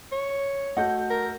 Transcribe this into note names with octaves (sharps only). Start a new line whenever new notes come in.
C#5
A3 F#4 D#5 F#5 G6
A#4